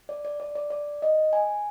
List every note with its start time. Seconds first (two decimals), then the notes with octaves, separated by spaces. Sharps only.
0.09 D5
0.25 D5
0.40 D5
0.56 D5
0.71 D5
1.02 D#5
1.33 G#5